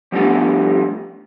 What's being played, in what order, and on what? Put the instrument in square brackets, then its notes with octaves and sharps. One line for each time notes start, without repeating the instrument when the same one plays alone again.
[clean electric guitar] F3 G3 A3 B3 D4